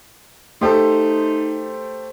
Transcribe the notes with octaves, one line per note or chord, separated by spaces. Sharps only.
A3 D#4 G4 A4 C5